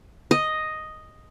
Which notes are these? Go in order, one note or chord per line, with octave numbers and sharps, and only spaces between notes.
D#5